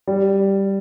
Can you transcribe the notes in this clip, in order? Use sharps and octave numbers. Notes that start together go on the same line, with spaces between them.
G3